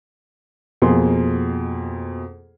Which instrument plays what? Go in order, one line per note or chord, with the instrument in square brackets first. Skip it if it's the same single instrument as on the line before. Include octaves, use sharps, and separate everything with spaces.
[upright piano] F2 B2 A#3 G#4 C6